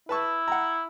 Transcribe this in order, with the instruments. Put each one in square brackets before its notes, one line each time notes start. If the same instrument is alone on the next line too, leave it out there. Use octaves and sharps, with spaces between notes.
[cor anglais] E4 [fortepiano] B4 A5 C#6
[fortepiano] F#5 A#5